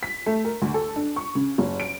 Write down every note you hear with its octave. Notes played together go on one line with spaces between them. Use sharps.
B6
A3
A#4
D2
A4
D4
C#6
C#3
F#1
D7